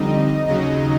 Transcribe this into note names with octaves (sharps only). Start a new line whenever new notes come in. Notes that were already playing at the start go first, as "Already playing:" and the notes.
Already playing: F2 D3 G3 C4 D#4 D#5
D#2 C#3 F#3 D#4 D#5